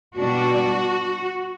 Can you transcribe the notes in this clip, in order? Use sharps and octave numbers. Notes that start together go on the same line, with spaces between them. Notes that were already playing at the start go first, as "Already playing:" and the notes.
B2 G3 D4 F#4